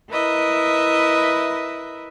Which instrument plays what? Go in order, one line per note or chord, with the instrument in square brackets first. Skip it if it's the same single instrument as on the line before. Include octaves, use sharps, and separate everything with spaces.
[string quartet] E4 A#4 B4 D#5 E5